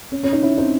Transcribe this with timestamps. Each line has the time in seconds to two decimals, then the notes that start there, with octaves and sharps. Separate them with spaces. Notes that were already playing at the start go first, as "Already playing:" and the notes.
0.12 C#4
0.23 C#4
0.32 D#4
0.42 C#4 E4
0.57 C4 D#4